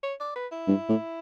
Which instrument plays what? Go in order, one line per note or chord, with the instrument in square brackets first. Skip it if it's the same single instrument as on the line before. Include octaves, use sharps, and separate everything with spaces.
[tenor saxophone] C#5
D5
B4
E4
[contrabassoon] G2
A2